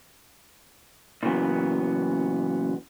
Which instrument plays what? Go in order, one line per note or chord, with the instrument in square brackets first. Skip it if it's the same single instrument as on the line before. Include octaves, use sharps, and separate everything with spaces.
[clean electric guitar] A#2 C#3 E3 F#3 B3